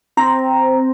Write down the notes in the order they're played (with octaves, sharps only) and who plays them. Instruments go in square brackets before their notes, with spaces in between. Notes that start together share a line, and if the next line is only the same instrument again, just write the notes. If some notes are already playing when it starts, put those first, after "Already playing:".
[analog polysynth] C4 [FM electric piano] A#5